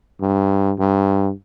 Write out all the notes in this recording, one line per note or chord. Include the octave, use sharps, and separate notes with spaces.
G2
G2